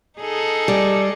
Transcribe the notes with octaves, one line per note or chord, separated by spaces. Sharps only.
D#4 G#4 A4
G3